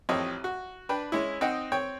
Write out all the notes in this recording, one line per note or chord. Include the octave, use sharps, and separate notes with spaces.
A1 F2 C4 C#5 D#5
F#4
D4 B4 G5 B5
G#3 C#4 E4
C4 D#4 D#5 F#5 G5
C4 C#5 G5